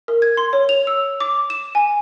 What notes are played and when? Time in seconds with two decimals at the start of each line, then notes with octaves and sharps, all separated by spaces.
0.08 A#4
0.22 G#6
0.37 C6
0.53 C#5
0.69 F7
0.87 E6
1.20 D6
1.50 E7
1.75 G#5